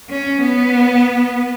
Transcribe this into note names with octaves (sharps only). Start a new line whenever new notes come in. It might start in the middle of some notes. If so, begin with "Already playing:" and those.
C#4
B3